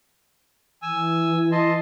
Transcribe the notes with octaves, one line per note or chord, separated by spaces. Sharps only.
E3 G#5 E6
D#5 A5 C6